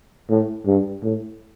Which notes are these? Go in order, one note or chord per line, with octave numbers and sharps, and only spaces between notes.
A2
G2
A2